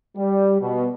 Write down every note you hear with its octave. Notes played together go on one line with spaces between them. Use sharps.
G3
B2